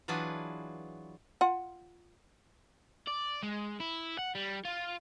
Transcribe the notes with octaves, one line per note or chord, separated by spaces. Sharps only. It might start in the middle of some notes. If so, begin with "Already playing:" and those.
E3 F#3 D4 F4 G#4 B4
F4 F#5
D5
G#3
E4
F#5
G3
F4